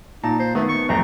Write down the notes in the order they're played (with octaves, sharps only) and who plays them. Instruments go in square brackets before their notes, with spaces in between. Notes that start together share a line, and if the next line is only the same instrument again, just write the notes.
[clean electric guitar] A#2 [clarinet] D#4 [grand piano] A5
[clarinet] C5
[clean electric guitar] D#3 [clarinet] A3 [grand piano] B3
[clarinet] C#6
[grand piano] D1 [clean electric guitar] F2 A3 C4 [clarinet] A#5